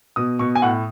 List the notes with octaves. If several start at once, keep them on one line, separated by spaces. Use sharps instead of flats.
B2 D#6
B2 C#6
G#5
A2 F#5